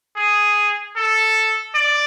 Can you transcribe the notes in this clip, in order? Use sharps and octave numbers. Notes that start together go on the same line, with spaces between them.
G#4
A4
D5